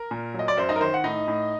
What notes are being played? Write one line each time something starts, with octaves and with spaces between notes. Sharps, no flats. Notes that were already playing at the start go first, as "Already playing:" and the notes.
Already playing: A#4
A#2
F#3 D#5
D5
F#2 C5
D#4 D#5
A#4
D#3 C5
F#5
A2 D#4 D#5
A2